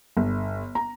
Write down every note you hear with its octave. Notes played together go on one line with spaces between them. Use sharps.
G1
A#5